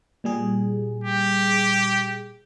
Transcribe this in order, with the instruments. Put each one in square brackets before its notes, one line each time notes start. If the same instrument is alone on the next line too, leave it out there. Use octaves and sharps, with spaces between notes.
[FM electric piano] A#2 G3 G#4
[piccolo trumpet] G4